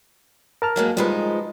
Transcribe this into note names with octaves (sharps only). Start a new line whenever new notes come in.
A#4 A5 F6
F#3 G#3 A#3
F3 G3 G#3 D#4 B4